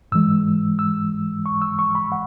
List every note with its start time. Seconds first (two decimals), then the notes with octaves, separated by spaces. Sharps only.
0.12 G#2 E3 G#3 E6
0.79 E6
1.46 C#6
1.62 E6
1.79 C#6
1.95 B5
2.12 F#5